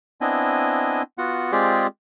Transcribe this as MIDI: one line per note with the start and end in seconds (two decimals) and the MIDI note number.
0.21 1.02 59
0.21 1.02 60
0.21 1.02 62
0.21 1.02 64
0.21 1.02 75
0.21 1.02 80
1.18 1.52 59
1.18 1.52 65
1.18 1.52 66
1.18 1.52 78
1.52 1.87 56
1.52 1.87 60
1.52 1.87 65
1.52 1.87 67
1.52 1.87 68
1.52 1.87 74